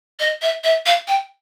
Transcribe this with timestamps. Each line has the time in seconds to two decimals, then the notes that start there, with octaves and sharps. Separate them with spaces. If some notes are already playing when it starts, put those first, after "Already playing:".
0.20 D#5
0.42 E5
0.64 E5
0.86 F5
1.08 G5